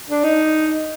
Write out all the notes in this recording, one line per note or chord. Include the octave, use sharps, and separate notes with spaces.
D4
D#4